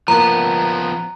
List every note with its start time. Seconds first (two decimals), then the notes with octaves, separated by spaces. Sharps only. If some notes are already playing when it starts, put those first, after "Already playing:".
0.08 F3 A#3 B3 A#5